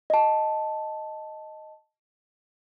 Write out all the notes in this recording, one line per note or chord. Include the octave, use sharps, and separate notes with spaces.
D#5 A5